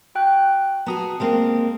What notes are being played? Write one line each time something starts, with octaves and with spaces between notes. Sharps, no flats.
F#4 G5 F#6
B3 F#4 G#4 A5 A#5 D#6
G#3 A#3 C4